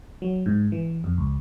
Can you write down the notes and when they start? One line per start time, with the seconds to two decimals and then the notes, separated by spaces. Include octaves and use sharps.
0.22 F#3
0.46 G#2
0.72 E3
1.04 F2
1.18 C#2